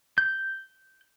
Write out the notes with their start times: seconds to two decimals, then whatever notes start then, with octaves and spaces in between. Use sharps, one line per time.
0.18 G6